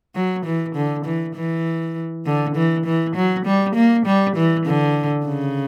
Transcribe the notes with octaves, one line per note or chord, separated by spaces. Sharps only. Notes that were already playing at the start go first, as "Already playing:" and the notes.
F#3
E3
D3
E3
E3
D3
E3
E3
F#3
G3
A#3
G3
E3
D3
C#3